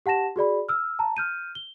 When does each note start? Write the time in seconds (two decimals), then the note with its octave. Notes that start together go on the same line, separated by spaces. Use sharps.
0.06 G4 F#5 A5 A#6 E7
0.36 F#4 G#4 D5 B5
0.69 E6 F6
0.99 A5 A#5
1.17 F6 G6 D#7
1.55 G7